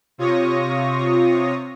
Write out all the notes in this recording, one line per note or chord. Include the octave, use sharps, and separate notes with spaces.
C3 F4 C#5 C#6 D#6 A#6